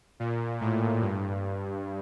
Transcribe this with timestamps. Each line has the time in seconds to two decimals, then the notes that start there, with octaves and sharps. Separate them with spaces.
0.20 A#2
0.61 A2
1.01 G2